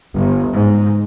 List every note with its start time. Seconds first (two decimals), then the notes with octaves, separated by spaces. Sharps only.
0.18 G1
0.53 G#2